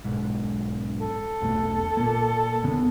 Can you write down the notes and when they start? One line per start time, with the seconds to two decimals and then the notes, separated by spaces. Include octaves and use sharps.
0.04 B1 G#2
1.00 A4
1.41 B1 E2 A3
1.97 A#2 A#3
2.63 E2 C#3 B3